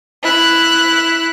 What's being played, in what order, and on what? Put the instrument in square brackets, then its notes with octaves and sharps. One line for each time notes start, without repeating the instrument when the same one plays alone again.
[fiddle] E4 F#6